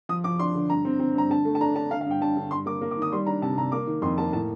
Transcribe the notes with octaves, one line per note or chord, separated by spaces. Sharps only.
F3 D#6
F3 D6
D4 C6
D3
G2 A#5
C4
C4
G2 A#5
D3 A5
A3
A5
D4 A#5
D4 A5
D3 F5
F5
G2 G5
G2 A5
D3
G2 C6
A#3 D6
A#3
D6
D#3 D#6
G3 C6
D4 A#5
C3 A5
C3 A#5
A#3 D6
D#3
F2 C6
A#3 A5
A2 A5